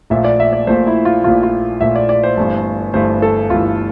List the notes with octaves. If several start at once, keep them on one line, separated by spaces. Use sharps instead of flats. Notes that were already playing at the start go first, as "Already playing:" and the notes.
A#1 A#2 A3 E5
D5
E5
D5
A#1 A#2 A3 C5
E4
F4
A#1 A#2 A3 F4
F4
A#1 A#2 A3 E5
D5
D5
C5
G1 G2 E3 A3
G1 G2 E3 A3 C5
A4
G1 G2 E3 A3 F4